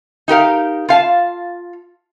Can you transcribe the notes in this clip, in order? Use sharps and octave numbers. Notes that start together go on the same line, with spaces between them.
D#4 G4 A#4 F5
F4 F5 A5